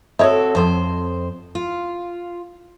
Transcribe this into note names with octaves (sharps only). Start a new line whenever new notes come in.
C4 F#4 A4 C#5 D#5 E5
F2 F3 C4 C5
F4